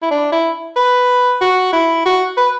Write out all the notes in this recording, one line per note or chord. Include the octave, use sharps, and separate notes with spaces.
E4
D4
E4
B4
F#4
E4
F#4
B4